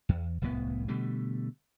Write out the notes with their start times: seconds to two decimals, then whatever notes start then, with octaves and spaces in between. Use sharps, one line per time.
0.09 E2
0.42 D1 C2 A2 B3
0.88 B2 D3 G3 A3